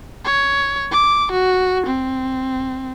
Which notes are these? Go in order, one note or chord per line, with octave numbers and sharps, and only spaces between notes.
C#5
D6
F#4
C4